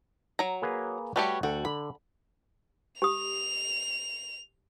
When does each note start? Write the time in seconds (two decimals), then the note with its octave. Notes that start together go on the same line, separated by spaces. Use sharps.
0.39 F#3 A#5
0.62 A#3 G#4 B4
1.16 G3 A3 F#4 G4 B4 C#5
1.43 D2 F#4 A4 G5
1.65 D3 B5
3.02 G4 D#6 F7